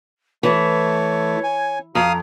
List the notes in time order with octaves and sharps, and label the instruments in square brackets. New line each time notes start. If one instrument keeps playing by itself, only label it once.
[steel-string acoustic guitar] E3 [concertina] A3 [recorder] C#5
[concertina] G#5
[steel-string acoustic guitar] F2 [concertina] F5 D#6 [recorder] A#5